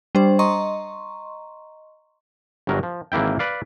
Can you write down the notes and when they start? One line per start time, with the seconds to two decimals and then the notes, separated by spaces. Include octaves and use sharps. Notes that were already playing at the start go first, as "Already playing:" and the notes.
0.15 G3 D4 C5
0.39 D#5 A#5 C6 C#6
2.67 G1 G2 F#3 A#4
2.83 F3
3.12 G#1 E3 A#3 E4 G5
3.39 B4 D5 F5